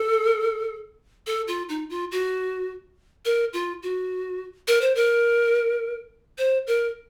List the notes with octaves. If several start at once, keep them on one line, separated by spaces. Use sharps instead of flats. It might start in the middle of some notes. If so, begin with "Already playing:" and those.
Already playing: A4
A4
F4
D#4
F4
F#4
A#4
F4
F#4
A#4
C5
A#4
C5
A#4